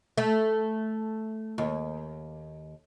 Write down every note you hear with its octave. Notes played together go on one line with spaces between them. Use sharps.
A3
D#2